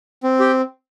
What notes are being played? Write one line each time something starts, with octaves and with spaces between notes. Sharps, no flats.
C4
G4